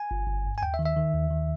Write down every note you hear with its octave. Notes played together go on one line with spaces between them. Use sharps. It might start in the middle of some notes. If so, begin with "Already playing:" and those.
Already playing: G#5
G1
G1
G2
G#5
D#2 G5
E5
D#3
E5
D#3
D#2
D#3